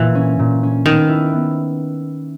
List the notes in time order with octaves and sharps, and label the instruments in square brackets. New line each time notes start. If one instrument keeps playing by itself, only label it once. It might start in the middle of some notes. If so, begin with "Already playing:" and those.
Already playing: [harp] A#2 [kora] E3
[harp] C#4
A#2
C#4
[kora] D#3 [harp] B3
[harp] E4
B3